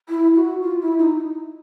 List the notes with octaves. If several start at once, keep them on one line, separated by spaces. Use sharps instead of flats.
E4
F#4
F4
E4
D#4